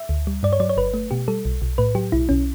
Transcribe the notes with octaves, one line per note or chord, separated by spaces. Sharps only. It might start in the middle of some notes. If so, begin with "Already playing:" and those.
Already playing: E5
D2
G3
G2 D5
C#5
F#3 D5
C#5
G1 B4
A3
B2 G4
G3 A4
B1
B1
A2 B4
F#3 G4
B1 E4
B1 C#4